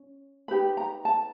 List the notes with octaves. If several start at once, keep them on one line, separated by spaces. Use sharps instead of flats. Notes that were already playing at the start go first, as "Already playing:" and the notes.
Already playing: C#4
D#4 G4 B4 B5
A#5
A5